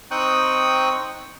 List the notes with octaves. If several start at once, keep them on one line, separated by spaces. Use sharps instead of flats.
C4 D#4 G5 C#6 D#6 F#6